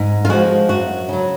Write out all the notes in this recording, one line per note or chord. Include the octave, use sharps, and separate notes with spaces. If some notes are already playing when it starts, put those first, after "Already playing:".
Already playing: G#2
F4
F3 G#3 F#4
F#2 F#4
C#3 F#3